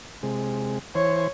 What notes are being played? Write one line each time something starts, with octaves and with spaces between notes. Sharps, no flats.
C3 G#3
E3 C5 C#5